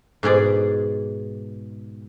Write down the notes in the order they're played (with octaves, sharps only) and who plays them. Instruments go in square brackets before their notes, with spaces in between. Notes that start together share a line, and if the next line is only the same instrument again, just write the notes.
[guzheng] G#2 B2 G#4 D5